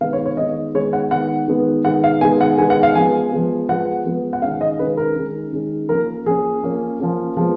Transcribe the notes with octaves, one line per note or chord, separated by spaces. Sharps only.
D#3 G#3 B3 F5
C#5
C#5
D#3 G#3 B3 D#5
D#3 G#3 B3 C#5
F#5
D#3 G#3 B3 F#5
D#3 G#3 B3
D#3 G#3 B3 F#5
F5
D#3 G#3 B3 G#5
F#5
D#3 G#3 B3 G#5
F#5
F5
F3 G#3 B3 G#5
F3 G#3 B3
F3 G#3 B3 F#5
F3 G#3 B3
F#5
D#3 G#3 C#4 F5
D#5
D#3 G#3 C#4 B4
A#4
D#3 G#3 C#4
D#3 G#3 C#4
F3 A#3 C#4 A#4
F3 A#3 C#4 G#4
F3 A#3 C#4
F3 A#3 C#4
F3 G#3 B3